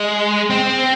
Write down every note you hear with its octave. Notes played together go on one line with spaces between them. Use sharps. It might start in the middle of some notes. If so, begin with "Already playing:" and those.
Already playing: G#3
C4